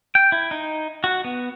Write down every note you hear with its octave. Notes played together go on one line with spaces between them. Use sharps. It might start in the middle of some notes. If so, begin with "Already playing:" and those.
G5
E4
D#4
F#4
B3